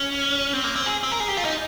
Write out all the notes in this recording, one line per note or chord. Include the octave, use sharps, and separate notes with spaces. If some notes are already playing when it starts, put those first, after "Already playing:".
Already playing: C#4
C4
A#3
C4
G#4
C4
A#4
G#4
G4
F4
D#4